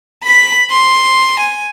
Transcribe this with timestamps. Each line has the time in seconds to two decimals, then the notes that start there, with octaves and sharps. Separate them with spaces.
0.23 B5 B6
0.71 C6
1.40 G#5